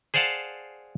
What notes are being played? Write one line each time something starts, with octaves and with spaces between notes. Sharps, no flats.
G#4 C5 D5 F5 F#5 A5